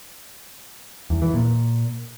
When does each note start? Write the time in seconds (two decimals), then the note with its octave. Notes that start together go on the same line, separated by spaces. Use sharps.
1.10 E2
1.22 E3
1.34 A#2